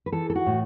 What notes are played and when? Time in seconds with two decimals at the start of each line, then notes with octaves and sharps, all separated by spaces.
0.06 B4
0.12 E3 A4
0.30 A4
0.35 F#4
0.46 A2